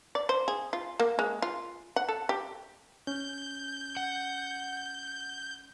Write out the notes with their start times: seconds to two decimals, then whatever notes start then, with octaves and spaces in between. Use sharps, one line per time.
0.15 D5
0.29 C5
0.48 G#4
0.73 F4
1.00 A#3
1.19 G#3
1.42 F4
1.96 F#5
2.09 A4
2.29 G4
3.07 C#4 G6
3.97 F#5